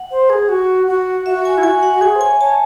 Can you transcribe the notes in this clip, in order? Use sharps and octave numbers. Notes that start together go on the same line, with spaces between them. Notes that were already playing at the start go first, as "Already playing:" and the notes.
Already playing: F#5
C5
G#4
F#4
F#4
F#4 E5
G#5
E4
F#4 G#5
F#5
G#4 G#5
C5
C#5 G#5
C#5 A5